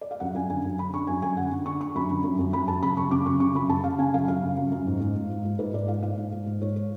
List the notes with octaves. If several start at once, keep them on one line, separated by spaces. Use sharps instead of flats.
D5
F5
F#2 F#5
F#2 G#5
D3 G#5
F#2
D3 B5
D3 C#6
F#2 G#5
F#2 G#5
D3 F#5
D3
D3 C#6
D3 C#6
F#2 B5
D3
F#2
F#2
F#2 B5
F#2 A5
C#3 B5
F#2 C#6
C#3 D6
F#2 C#6
C#3 C#6
F#2 B5
C#3 A5
C#3 F5
C#3 G#5
F#2 F5
F#2 F5
C#3
F#2
F#2
G#2
G#2
G#2
G#2
G#2
G#2 B4
G#2 D5
G#2 F5
G#2 F5
G#2
G#2
G#2
G#2 C#5
C#5